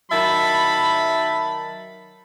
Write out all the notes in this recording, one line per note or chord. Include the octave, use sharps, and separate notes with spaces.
D#3 F#3 E5 A5 B5